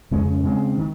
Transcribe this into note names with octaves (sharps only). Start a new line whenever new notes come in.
F2 C#3 G#3 C#4
C#3 G#3 C4
D#3